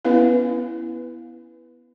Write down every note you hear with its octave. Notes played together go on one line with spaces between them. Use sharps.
B3 C#4 E4 B4